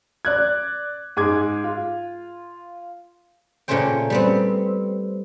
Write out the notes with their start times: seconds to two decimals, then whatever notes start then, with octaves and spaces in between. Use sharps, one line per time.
0.25 D5 F#6 G#6
1.17 G#2 G#4 D6 G#6
1.64 F4
3.68 A#2 C#3 A3 C#4 C5 G5
4.10 G3 B3 C4